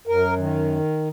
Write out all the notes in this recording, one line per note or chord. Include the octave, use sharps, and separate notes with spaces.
F#2 A#4
D#3